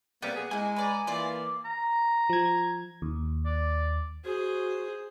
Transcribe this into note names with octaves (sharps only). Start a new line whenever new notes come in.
C3 G3 A#3 B3 G5
G#4
G#3 A#3 E4 G#5
B4 D5 A#5
E3 A#3 F4 D5
A#5
F3 G#6
D#2
D5
F#4 G#4 C5